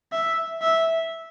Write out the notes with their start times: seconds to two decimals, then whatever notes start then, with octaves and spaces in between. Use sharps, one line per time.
0.12 E5
0.62 E5